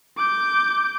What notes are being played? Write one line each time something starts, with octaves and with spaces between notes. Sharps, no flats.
D6 G6